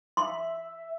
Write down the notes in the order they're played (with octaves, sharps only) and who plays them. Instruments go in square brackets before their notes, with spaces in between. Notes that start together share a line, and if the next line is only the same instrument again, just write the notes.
[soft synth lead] E5 [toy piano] C6